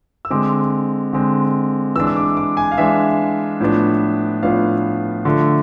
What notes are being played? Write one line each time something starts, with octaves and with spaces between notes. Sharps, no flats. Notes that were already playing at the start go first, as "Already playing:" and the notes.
E6
D3 G#3 C4 D6
D3 G#3 C4
E3 G#3 D4 E6
E6
D6
D6
G#5
F5
E3 G#3 D4 E5
A2 F3 B3 D4
A2 F3 B3 D4 F5
D3 F3 A3 D4